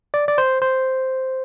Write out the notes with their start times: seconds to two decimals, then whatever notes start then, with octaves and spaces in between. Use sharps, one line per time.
0.14 D5
0.28 D5
0.38 C5
0.62 C5